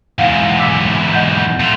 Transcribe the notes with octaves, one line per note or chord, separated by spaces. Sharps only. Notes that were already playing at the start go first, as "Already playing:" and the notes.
E2 G#2 F5 F#5
D6 E6 B6
D#5 F#5 G6
A3 F4